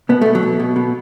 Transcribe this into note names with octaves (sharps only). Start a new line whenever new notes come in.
B2 B3
A3
B2
F#3
B2
B2
B2